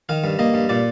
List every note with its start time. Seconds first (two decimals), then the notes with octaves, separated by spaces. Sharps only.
0.09 D#3 F5
0.24 G2
0.39 A#3 D#5
0.54 G2
0.69 A#2 D5